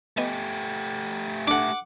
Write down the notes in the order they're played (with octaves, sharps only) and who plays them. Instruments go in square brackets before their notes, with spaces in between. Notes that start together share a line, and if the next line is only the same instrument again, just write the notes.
[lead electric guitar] A3 G4 [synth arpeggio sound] B3 D#5 G#5
[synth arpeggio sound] D4 A4 [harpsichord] F#5 D6